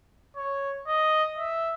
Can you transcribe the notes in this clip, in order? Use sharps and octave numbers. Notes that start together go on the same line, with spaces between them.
C#5
D#5
E5